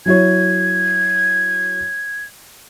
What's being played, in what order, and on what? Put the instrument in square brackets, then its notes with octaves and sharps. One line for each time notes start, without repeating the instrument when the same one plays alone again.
[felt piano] F#3 E4 C#5 [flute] G#6